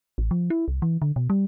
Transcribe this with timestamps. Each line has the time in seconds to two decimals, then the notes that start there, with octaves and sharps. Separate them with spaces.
0.18 A1
0.31 F3
0.50 E4
0.68 C2
0.82 E3
1.02 D3
1.16 B2
1.30 G3